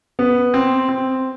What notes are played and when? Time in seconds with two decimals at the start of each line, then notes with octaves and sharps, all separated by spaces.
0.19 B3
0.54 C4
0.89 C4